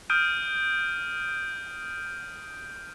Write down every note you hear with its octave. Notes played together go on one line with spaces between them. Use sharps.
D#6 F6 G6 D7 D#7